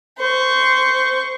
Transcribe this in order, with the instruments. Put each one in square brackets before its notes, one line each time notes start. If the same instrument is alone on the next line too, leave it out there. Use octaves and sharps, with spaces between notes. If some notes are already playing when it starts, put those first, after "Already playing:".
[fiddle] C5 C#6